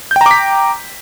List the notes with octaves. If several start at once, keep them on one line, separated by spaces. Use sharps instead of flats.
G5 A#5 D6 G6 B6